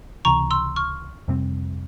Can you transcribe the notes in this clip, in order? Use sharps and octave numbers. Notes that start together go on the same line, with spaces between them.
C#2 C3 E3 A#5 C#6
C6 E6
C#6 F6
F2 C3 G3 C4